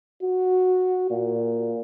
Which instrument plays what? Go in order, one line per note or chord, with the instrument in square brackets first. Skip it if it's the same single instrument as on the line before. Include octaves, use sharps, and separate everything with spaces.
[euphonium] F#4
A#2